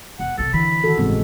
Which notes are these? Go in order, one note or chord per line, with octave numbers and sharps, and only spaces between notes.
E1 F#5
B1 C3 A4
D3 E3 B5
D#3 F#4 A4
G1 A2 C#3 G#3 C4